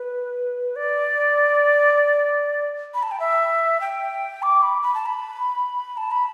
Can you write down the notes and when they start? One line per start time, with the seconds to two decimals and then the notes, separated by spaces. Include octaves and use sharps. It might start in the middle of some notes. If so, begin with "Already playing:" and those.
Already playing: B4
0.76 D5
2.94 B5
3.03 A5
3.11 G5
3.20 E5
3.81 G5
4.43 D6
4.63 B5
4.82 B5
4.94 A5
5.06 B5
5.97 A5
6.11 B5